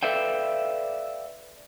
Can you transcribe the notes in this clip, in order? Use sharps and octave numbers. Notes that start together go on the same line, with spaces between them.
A4 B4 D5 E5 F5 G5